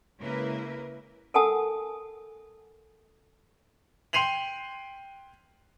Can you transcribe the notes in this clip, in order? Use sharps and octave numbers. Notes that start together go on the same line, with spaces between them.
C#3 G#3 A#3 E4 A#4 B4
A4 A#4 F#5 G#5 A5 D#6
G5 C6 C7 D#7 F7 F#7